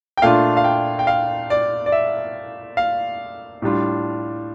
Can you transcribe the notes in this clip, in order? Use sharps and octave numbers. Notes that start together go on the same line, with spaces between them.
G5
A#2 A3 D4 F4 F5
F5
G5
G5
F5
D5
D5
E5
F5
A2 G3 D4 F4